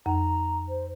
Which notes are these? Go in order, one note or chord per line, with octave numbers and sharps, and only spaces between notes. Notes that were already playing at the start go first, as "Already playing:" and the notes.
F2 A#5
C5